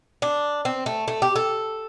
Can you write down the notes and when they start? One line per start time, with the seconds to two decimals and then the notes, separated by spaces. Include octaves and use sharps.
0.22 D4
0.65 C4
0.86 A3
1.08 A3
1.22 G4
1.36 A4